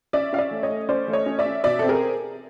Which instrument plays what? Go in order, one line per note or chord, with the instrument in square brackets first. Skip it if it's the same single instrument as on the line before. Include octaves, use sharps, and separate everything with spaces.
[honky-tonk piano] C#4 D5 E5
C#4 F5
D5 E5
A3
C#5 D#5
A3
C#4 C5 D5
A3
C#5 D#5
C#4
D5 E5
C#4
B2 D5 E5
C4 A4
G#4 A#4